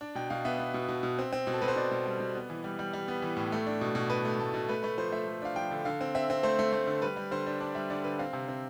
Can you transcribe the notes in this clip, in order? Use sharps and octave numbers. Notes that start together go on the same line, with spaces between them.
D4 D5
B2 G5
B2 F5
B3 E5
B3
B2
B2
B2
C4
C4
B2
A4
B2 B4
C5
B2 D5
B2
G3
B2
B3
E3
G3
G3
G3
B3
E3
A2
A3
D4
B2
B2
B2 B4
A3
A3 A4
B2
A3 B4
A3 B4
F3 C5
A3 E5
A3
D4 F5
F3 G5
D3
D3 F5
C4
C4 E5
C4
A3 C5
A3
A3
D3
G3 B4
G3
D3 C5
D4
D4 D5
G3 E5
D3 D5
D3 B4
C4 F5
C3
C4